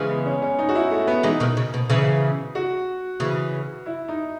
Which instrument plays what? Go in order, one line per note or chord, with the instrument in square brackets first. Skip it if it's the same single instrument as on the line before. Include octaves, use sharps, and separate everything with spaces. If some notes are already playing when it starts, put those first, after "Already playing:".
Already playing: [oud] C#3 E3 [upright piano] G#3
[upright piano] B3
C#4
C#4
D#4
F#4
E4
A3
B3
[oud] E3 G#3 [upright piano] D#4
[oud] B2 D#3
C#3
B2
C#3 E3
[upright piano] F#4
[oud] C#3 E3
[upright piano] E4
D#4